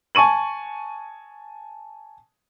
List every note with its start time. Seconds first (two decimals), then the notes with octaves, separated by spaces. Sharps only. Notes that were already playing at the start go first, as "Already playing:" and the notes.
0.15 G#5 A5 C#6 D#7 F#7